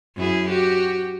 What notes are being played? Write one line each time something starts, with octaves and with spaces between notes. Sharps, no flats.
F#2 E4 G#4
F#4 G4